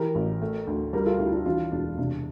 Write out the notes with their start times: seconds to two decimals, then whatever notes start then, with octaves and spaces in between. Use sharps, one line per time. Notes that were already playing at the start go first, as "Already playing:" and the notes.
Already playing: E3 G4 A#4
0.15 A1
0.41 A3
0.67 D2
0.93 G3 G4 A#4
1.06 F4 A4
1.19 D2 E4 G4
1.33 D4 F4
1.46 E3 D4 F4
1.72 E1 D4
1.98 C3 D4